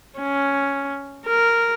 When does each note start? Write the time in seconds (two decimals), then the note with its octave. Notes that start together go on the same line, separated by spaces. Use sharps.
0.19 C#4
1.27 A#4